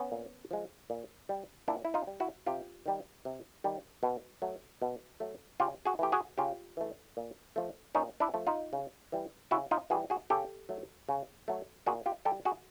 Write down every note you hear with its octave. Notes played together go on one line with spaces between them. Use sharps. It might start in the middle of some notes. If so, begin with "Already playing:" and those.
Already playing: B3 C#4
A#2
F3 G#3
A#2
G3
A#2 D4 E4
E4
D#4 F4
G3
E4 F#4
C3 F4 G4
D#3 G3
C3
D#3 G3
B2
F#3 A3
B2
F#3 A3
C#3 F4 G4
F#4 G#4
E3 A3 G4
F#4 G#4
C#3 F4 G4
E3 A3
A#2
F3 A3
A#2 C#4 D#4
D4 E4
F3 A3
D#4 F4
C#3
E3 G3
C#3 E4 F#4
D#4 F4
E3 G3 F#4 G#4
F#4 G#4
C#3 G4 A4
F#3 A3
C#3
F#3 A3
A#2 F#4 G#4
F4 G4
G3 G4 A4
F#4 G#4